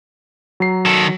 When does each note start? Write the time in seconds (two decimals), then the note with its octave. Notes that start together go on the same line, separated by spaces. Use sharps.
0.60 F#3 A#5 C7
0.86 D#3 A4